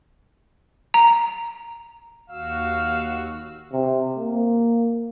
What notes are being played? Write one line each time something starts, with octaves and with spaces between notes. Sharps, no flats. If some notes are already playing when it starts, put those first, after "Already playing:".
A#5
D#2 F#4 F5 E6
C3
A#3